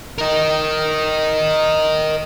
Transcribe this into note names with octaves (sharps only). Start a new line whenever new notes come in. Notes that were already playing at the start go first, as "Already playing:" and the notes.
A#4 D#5